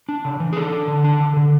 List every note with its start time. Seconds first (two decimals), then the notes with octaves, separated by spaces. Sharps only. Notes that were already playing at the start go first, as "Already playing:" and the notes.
0.09 D4
0.25 C#3
0.40 E3
0.53 G#4
0.56 D4 A4
0.72 D4
0.88 D3
1.04 D4
1.20 D3
1.37 D3